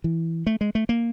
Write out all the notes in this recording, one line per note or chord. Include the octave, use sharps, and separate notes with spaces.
E3
A3
G#3
A3
A#3